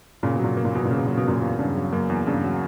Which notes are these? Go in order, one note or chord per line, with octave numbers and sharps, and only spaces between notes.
A#2 C#3
B2
A#2 F#3
B2 A#3
A#2
E2 B2
A#2
C#3
B2
A#2 F#3
B2
F#2 A#2 A#3
E2
G2 C#3
F#3
F#2 A#3
E2
G2 C#3
F#3